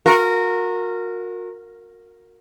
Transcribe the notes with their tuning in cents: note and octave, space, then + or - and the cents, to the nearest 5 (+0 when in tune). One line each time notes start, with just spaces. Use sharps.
F#4 -35 A#4 -15